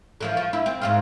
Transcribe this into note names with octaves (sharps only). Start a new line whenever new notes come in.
D3 E3 F3
F3
E4
C4
G#2 C4 F4